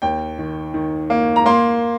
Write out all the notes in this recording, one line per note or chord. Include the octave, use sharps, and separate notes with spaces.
D#2 G5
D#3
D#3
A#3
A#5
A#3 C6